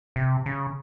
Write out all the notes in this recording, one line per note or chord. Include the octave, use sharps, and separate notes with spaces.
C3
C#3